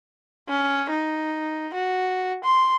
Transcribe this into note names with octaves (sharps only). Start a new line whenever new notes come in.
C#4
D#4
F#4
C6